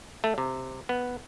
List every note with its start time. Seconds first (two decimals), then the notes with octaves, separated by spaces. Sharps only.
0.24 A3
0.38 C3
0.89 B3